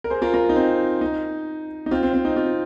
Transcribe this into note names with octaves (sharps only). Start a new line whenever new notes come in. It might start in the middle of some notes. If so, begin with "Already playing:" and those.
A#4
G#4 C5
F4 A#4
F4 A#4
D#4
C4
D#4
D#4
C4 F4
C4
C4
D#4
C4 F4